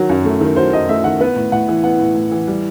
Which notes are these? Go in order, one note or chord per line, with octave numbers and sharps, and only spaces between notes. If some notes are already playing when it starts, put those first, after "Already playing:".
Already playing: D#3 F#3
F#2
A3
D#3
F#3 C5
F#2 D#5
A3 E5
D#3 F#5
B3 B4
A2
A2 F#5
E3
B3 F#5
A2
A2
E3
G3